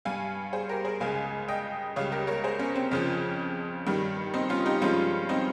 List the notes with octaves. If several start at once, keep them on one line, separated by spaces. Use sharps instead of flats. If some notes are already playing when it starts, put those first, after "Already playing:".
G2 G3 F5 G#5
G#4 C5
G4 A#4
G#4 C5
C#2 C#3 G#3 F5 G#5
D#5 G5
C#2 C#3 G3 C#5 F5
G4 A#4
A#4 C#5
G#4 C5
C#4
C4
F2 C#3 F3 C#4
G2 D#3 G3
C4 D#4
C#4 F4
D#4 G4
G2 F3 G#3 C#4 F4
C4 D#4